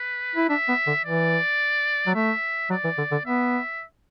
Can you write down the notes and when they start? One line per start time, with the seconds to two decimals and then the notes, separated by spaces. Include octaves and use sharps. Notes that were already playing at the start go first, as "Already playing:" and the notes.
Already playing: B4
0.35 E4
0.49 D4 E5
0.68 B3
0.87 D3
1.05 E3 D5
2.07 F#3
2.15 A3 E5
2.70 F#3 D5
2.84 E3
2.98 D3
3.11 D3
3.26 B3 E5